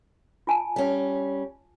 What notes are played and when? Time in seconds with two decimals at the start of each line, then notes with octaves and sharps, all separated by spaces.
0.47 F4 G#5 A5
0.76 G3 C#4